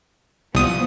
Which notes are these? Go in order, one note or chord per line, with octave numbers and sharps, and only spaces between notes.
C2 F3 B3 D#6